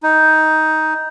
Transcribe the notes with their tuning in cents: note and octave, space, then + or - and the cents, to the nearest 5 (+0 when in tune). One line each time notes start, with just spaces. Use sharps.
D#4 +10